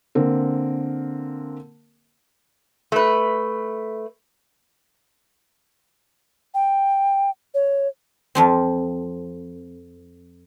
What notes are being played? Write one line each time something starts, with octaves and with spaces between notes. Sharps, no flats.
D3 A#3 C4 A#4
A3 B4
G5
C#5
F2 F3 C4